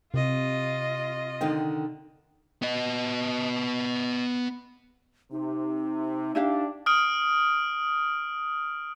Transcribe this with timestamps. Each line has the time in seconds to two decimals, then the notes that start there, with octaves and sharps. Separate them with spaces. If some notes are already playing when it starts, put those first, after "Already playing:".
0.14 C3 F4 D#5
1.41 D3 D#3 G5
2.62 B3 D#5
5.32 C3 D#4
6.35 D4 E4 G4 F5
6.86 D#6 F6 D7